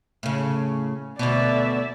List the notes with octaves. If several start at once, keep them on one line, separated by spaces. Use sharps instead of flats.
A2 C#3
D2 B2 D5 E5